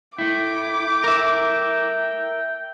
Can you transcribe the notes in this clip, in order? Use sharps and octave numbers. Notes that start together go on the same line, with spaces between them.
A3 E4 G5 D6
A#4 E5